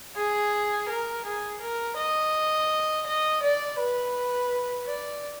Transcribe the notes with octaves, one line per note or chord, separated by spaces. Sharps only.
G#4
A#4
G#4
A#4
D#5
D#5
D5
B4
D5